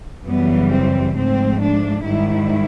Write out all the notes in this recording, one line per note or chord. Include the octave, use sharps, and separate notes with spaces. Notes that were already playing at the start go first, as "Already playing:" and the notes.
F#2 C#3 E3 G3 B3
C4
G#2 F3 A3 C4
D4
G#2 D#3 G3 E4